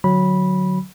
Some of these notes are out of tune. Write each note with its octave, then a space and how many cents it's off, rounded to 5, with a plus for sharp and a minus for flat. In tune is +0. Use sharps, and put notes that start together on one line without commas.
D3 +20 F#3 +0 B5 -15